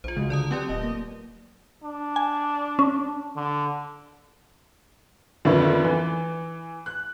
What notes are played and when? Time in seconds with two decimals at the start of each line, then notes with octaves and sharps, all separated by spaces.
0.04 B1 F4 C5
0.16 C#2 C#3 G#3 F#4
0.30 D3 D5 A5 D#6
0.51 F#3 A3 C4 G4 D5 F#5
0.69 D#1 D#5
0.84 A#3
1.84 D4
2.16 G#5
2.79 C#4
3.36 D3
5.45 F2 D3 D#3 B3 C#4 E4
5.84 E3
6.86 F#6